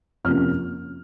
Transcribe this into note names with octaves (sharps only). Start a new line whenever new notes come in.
F2 C3 F3 A#3 C#4 F6